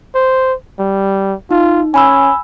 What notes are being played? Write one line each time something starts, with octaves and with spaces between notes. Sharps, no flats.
C5
G3
D#4 F4
C#4 G#5 B5 E6